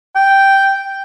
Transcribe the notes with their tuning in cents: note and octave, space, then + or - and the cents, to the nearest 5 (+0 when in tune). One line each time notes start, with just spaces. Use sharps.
G5 -5